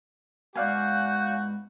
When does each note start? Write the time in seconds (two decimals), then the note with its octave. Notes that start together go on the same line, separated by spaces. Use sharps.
0.56 G#2 B3 F#4 D5 F5 G#5 F#6 G6